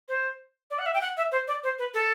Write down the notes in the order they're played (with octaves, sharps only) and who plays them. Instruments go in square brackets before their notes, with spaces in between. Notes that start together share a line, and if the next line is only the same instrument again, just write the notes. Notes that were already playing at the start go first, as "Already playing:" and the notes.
[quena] C5
D5
F#5
E5
G5
F#5
E5
C5
D5
C5
B4
A4